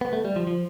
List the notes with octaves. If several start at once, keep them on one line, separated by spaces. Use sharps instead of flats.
B3
A3
G3
F3
F3